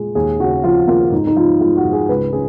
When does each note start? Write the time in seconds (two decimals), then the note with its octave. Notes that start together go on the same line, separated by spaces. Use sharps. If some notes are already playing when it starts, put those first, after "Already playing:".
Already playing: A#2 G#3
0.15 D#2 G#4
0.40 C#3 F#4
0.64 F3 F4
0.87 A#3 F4
1.12 G#2 D#4
1.27 D#4
1.36 F3 F4
1.60 G#3 F4
1.77 F#4
1.85 G#2
1.93 G#4
2.09 C#2 B4
2.33 C#3 G#4